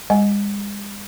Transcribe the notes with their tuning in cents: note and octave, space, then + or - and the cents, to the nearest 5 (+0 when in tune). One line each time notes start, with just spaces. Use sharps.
G#3 -40 D#5 +0 G#5 +15